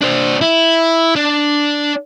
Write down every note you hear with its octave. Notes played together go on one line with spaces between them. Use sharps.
D4 C5
E4
D4